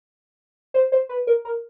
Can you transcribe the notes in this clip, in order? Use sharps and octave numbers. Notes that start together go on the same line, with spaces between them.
C5
C5
B4
A#4
A#4